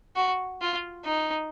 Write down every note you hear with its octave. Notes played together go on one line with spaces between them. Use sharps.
F#4
F4
D#4